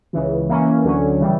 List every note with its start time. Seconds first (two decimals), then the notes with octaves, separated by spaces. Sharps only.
0.13 C#2 C#3 E3
0.49 E3 A#3 C#4
0.85 D2 D3 F#3 C#4
1.20 C#3 E3 G3